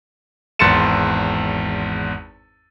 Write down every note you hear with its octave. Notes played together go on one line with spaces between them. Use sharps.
G#1 E2 C6 A6 C#7 E7